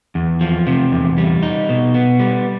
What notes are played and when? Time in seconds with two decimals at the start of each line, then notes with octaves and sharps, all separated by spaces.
0.15 E2
0.41 F3
0.67 C3
0.92 E2
1.18 G3
1.43 D#4
1.69 B2
1.94 B3
2.19 G3